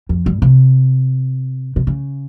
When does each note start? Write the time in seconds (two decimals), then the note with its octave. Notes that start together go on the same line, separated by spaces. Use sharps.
0.09 F2
0.26 G2
0.42 C3
1.76 C3
1.87 C#3